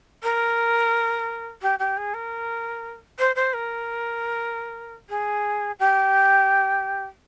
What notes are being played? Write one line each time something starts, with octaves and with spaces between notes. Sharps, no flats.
A#4
G4
G4
G#4
A#4
C5
C5
A#4
G#4
G4